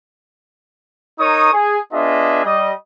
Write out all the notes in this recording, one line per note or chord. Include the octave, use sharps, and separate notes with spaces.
D#4 A#4 C#5 C#6 D#6
G#4
B3 D4 F4 G#4 D#5 E5
G3 D#5